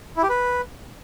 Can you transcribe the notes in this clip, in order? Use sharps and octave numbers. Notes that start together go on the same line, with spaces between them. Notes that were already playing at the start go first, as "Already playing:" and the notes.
E4
G4
B4